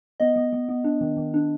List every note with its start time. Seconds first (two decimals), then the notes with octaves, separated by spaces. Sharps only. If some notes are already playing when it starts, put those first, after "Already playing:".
0.20 B3 D#5
0.36 B3
0.53 B3
0.69 B3
0.84 D4
1.01 D#3
1.17 D#3
1.34 D4